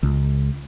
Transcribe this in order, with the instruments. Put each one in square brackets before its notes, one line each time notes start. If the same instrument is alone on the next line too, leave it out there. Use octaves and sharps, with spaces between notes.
[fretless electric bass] C#2